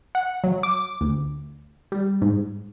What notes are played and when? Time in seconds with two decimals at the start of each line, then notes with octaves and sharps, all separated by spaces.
0.15 F#5
0.44 F#3
0.63 D6
1.01 D2
1.92 G3
2.22 G#2